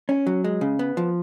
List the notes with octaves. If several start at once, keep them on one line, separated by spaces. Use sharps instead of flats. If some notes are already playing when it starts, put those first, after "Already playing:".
C#4
F#3
G#3
C#3
B3
F3